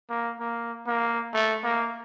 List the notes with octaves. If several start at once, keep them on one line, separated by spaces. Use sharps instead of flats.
A#3
A#3
A#3
A3
A#3